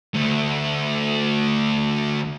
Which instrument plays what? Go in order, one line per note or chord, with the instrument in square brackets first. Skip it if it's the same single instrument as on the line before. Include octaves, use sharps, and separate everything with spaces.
[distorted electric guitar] D2 A3